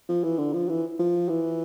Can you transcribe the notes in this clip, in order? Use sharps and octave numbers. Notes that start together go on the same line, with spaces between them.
F3
E3
D3
F3
E3
F3
E3